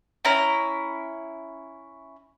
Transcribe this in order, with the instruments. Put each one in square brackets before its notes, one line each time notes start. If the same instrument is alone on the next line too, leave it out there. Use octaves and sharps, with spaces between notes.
[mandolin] C#4 E4 A#5